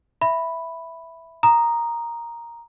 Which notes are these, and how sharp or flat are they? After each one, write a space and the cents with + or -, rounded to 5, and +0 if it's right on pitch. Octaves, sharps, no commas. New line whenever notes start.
E5 +0 B5 +0
A#5 +0 D#6 -15